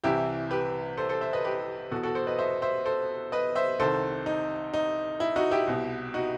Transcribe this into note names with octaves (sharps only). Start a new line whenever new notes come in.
C2 C3 E3 E4 G4
G4 B4
A4 C5
A4 C5
C5 E5
B4 D#5
G4 B4
E2 B2 F#4 A4
F#4 A4
A4 C5
B4 D#5
C5 E5
C5 E5
A4 C5
B4 D#5
C5 E5
C2 C3 D#3 A4 C5
D#4
D#4
E4
D#4 F#4
E4 G4
C2 B2
D#4 F#4